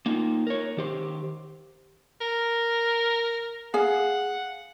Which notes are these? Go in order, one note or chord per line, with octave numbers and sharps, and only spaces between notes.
A#3 D#4 F4
A#4 C#5
D#3 G4 C5
A#4
G#4 F5 F#5